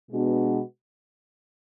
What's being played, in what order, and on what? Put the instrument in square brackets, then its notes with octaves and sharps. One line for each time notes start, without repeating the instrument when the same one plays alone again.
[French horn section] B2 G#3 B3 D4 F#4